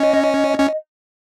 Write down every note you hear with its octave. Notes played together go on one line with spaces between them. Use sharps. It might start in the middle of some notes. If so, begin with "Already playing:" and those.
Already playing: C#4 D#5
C#4